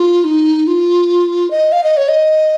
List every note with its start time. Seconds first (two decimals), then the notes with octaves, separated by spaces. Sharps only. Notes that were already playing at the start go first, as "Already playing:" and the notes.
Already playing: F4
0.24 D#4
0.67 F4
1.51 D#5
1.72 F5
1.84 D#5
1.97 C#5
2.08 D#5